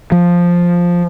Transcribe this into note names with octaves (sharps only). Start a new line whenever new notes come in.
F3